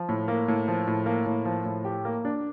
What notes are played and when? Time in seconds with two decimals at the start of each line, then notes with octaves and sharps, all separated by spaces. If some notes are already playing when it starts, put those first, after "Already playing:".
Already playing: F3
0.09 A2
0.28 A#3
0.48 A2
0.68 F3
0.88 A2
1.06 A#3
1.26 A2
1.45 F3
1.65 A2
1.85 G4
2.05 A#3
2.25 D4